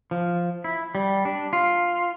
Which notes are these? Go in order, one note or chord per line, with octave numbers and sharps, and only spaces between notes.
F3
E4
G3
D4
F4